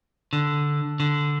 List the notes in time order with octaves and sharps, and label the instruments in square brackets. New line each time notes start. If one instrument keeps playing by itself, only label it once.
[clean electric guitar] D3
D3